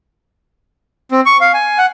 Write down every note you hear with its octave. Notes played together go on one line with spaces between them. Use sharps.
C4
C#6
F5
G#5
F#5